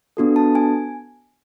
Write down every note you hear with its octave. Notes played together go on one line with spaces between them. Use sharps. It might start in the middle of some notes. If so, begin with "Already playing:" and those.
B3 D4 F#4 A4
A5
G#5